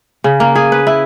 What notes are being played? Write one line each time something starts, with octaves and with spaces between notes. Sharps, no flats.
C#3
A#3
G#4
B4
E4